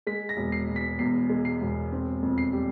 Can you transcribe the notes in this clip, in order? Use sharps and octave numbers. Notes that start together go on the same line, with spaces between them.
G#3 B6
A#6
E1
C7
B2
B6
E2 C7
G#3
C7
E1
C4
F2
C7
G3